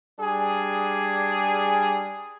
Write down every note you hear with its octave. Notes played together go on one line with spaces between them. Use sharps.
G3 D4 G#4